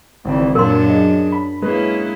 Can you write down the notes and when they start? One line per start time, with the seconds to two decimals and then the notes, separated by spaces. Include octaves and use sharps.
0.25 G#1 C#3 E3 C4 D5
0.55 F#2 A#2 F#3 D4 A#4 C6
0.89 G#4 D#5
1.32 B5
1.62 G#3 A#3 C#4 E4 G#4 B4